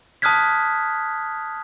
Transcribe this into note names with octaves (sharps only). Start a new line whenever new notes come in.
A5 D#6 F6 F#6 G#6 B6